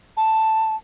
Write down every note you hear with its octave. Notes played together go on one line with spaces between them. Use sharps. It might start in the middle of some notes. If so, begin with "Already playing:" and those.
A5